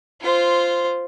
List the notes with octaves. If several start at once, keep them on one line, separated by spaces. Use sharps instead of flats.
F4 C5